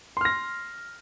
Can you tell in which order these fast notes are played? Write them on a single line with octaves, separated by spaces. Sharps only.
C6 F6 A#6